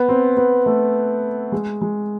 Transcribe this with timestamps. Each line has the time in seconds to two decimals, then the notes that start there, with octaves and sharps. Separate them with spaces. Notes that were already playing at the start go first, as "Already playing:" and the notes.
Already playing: B3
0.09 C4
0.37 B3
0.66 A3
1.52 G#3
1.81 G#3